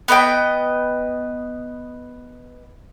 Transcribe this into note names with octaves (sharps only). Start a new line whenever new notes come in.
B3 B4 D#5 G5